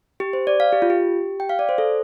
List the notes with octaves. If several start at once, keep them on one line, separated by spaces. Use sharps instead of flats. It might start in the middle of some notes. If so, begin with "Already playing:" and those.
G4
C5
D5
F5
G4
F4
G4
G5
F5
D5
C5
A4